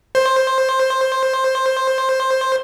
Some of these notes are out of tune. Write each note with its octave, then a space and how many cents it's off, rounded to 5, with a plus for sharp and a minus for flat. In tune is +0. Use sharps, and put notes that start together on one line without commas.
C5 +10